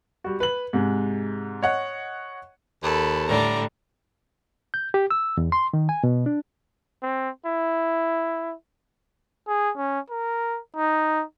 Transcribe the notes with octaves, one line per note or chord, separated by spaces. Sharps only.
G3 F#4
B4 F#7
G#2 C3 G#3
C#5 D#5 F#5
D#2 A4 B5
A2 D3 G3 D5 A#5
G6
G4
E6
E2
C6
D#3
G#5
B2
D4
C4
E4
G#4
C#4
A#4
D#4